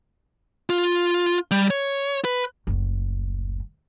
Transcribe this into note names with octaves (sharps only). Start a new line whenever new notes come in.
F4
G3
C#5
B4
F#1 D2